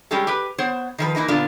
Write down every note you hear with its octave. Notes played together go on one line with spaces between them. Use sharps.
G3 G#3 C#4 G4 A4
G4 B4
B3 C5 C#5
D#3 F3 B4
E3 A#3 D#4 A#4
A#2 D3 B3 D4 F4